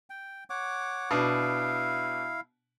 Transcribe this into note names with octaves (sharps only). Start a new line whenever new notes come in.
G5
C#5 F#5 D6
B2 D4 E4 F5